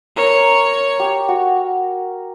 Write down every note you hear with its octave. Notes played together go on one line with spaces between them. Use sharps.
A#4 C#5
G4
F#4